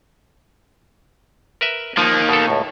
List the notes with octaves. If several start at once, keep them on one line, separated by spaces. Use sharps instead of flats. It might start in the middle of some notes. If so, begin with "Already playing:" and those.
A#4 B4 E5
D#3 F3 A#3 D#4
B2 B3 A4
C#2 A2